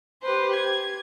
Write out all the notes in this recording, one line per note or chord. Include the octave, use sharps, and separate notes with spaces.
G4 B4 C5
G#6